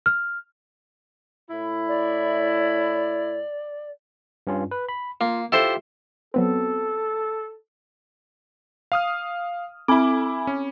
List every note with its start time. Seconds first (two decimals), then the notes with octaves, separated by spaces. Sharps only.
0.06 F6
1.50 A2 E4
1.88 D5
4.47 G2 C#4 F4
4.71 B4
4.89 B5
5.21 A#3 F4
5.52 E4 F4 G4 A4 C5 E5
6.34 F#3 B3 C4 A4
8.92 F5 D#6 F6
9.88 C4 E4 G#5 B5 D6
10.47 C#4